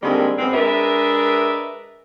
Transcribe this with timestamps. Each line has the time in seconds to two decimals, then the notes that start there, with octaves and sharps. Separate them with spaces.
0.03 D3 D#3 G3 G#3 A#3 C4
0.38 F#2 G#3 B3 C4
0.54 G#3 D4 A#4 B4 E5